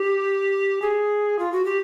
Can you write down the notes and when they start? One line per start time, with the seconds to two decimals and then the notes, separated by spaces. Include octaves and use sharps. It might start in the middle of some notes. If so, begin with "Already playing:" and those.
Already playing: G4
0.82 G#4
1.39 F4
1.52 F#4
1.65 G4